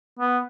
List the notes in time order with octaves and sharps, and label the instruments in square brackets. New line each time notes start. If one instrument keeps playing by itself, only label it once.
[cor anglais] B3